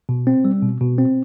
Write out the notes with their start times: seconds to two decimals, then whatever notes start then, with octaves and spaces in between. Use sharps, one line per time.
0.09 B2
0.27 C4
0.45 G3
0.63 B2
0.81 B2
0.98 C4